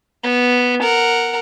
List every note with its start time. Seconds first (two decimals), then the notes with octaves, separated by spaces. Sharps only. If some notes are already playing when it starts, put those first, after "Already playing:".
0.24 B3
0.82 A#4 F#5